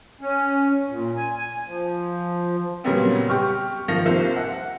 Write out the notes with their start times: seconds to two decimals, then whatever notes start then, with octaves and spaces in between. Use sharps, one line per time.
0.21 C#4
0.89 A#2
1.16 G#5
1.38 G#5
1.66 F3
2.84 A#2 C#3 F#3 G3 B3 C4
3.28 G4 C#6 F6
3.88 D#3 F3 F5 A#6 C#7 F7
4.05 C2 C3 A#3 F4 C5
4.36 F#5